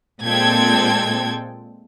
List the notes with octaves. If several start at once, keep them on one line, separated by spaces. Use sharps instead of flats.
A#2 G#3 C4 A4 G5 G#6